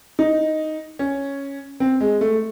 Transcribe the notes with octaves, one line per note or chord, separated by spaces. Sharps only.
D#4
C#4
C4
G#3
A3